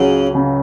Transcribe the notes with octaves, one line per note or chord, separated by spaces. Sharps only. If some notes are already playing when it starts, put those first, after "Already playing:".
Already playing: C#2 C#3 F#3
C#3